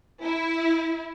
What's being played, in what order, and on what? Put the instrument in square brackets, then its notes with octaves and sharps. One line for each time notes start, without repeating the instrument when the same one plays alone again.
[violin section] E4